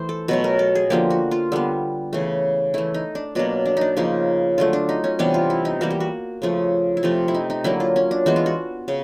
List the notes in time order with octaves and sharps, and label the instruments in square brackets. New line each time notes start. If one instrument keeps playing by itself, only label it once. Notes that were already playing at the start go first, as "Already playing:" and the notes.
Already playing: [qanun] E3 A3 C5
A4
B2 F#3 A3 B4
A#4
A4
G#4
D3 F3 A#3 G4
F#4
F4
D3 G3 B3
C#3 E3 A3
E3 A3 E4
D#4
D4
B2 F#3 A#3 D4
D4
D4 D#4
C#3 F3 A#3 D#4
D3 F#3 A3 F4
D4
D#4
C#4
C3 E3 G3 B3 D4
F4
E4
D#4
E3 G3 A#3 F#4
G4
F#4
C#3 F3 A3
E4
C3 F3 A3 F4
E4
D#4
D#4
D3 F#3 A#3 E4
F4
C#4
D4
E3 G#3 B3 F#4
F4
F#4
C#3